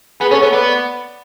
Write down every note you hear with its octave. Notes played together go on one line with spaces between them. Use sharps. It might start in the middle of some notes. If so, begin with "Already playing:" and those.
B3 G#4 B4
C#4 A4 C#5
B3 A4 C#5
B3 B4 D5